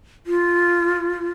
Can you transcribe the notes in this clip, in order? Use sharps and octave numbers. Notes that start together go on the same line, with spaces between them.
F4